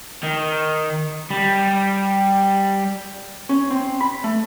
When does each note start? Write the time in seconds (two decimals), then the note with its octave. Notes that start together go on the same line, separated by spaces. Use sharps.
0.23 D#3
1.30 G3
3.49 C#4
3.71 C4
4.01 B5
4.24 A3